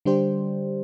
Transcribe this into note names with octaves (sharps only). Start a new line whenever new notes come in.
D3 G3 D4 G4 C5